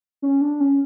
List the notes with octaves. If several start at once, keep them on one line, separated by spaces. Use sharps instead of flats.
C#4
D4
C#4